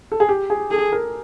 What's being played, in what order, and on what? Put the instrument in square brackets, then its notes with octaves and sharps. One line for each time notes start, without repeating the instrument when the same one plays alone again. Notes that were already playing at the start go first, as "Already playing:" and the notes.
[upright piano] A4
G#4
G4
G#4
[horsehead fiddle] G#4 [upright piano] A4
[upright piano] A#4